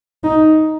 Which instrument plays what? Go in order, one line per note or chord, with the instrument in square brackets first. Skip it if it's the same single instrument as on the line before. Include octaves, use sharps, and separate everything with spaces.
[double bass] D#4